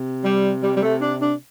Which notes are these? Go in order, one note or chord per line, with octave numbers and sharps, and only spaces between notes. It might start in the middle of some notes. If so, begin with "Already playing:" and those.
Already playing: C3
G3
G3
G3
A3
D4
D4